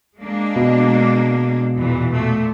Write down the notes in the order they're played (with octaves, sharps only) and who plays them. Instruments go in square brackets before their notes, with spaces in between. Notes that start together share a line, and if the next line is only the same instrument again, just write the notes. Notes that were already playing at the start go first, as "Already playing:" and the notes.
[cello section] G#3 A#3 D4
[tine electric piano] B2
[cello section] E2 A#2 E3
A#2 A3